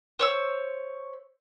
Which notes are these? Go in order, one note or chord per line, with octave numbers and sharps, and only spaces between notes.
C5 C#5 E6